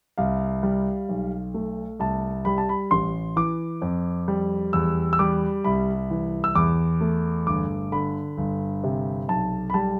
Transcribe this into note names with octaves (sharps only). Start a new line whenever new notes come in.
C2 F5
G3
B1
A3
C2 A5
G3 B5
A5
B5
A1 C6
E3 D6
F2
G3
E2 E6
E6
G3 D6
C2 B5
E3
E6
E2 D6
A3
G1 D6
D3 B5
G1
C3
B1 A5
B5
G3 A5